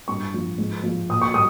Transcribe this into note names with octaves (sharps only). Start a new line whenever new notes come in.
G2 C#6
F3
G#2
F3
A#2 D#6
C#6
G3 D#6